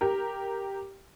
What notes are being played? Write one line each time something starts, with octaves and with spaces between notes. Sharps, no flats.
G4 A#4